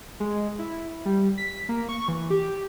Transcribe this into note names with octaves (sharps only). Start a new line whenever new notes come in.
G#3
E4
G3
B6
A#3
C#6
E3
G4